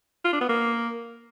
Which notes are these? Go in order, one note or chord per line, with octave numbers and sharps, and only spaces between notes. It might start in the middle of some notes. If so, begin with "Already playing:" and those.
F4
D4
B3
A#3